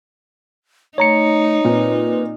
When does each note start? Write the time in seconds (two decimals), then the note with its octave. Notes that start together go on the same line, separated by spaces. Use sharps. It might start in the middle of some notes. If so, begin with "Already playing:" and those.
0.98 A3 D#4 C#5 A#5 C#7
1.65 A#2 C4 B4